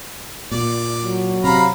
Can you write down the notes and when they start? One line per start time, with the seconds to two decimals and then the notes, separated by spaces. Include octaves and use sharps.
0.52 A#2 D5
1.02 F#3
1.44 C3 F5 A#5 B5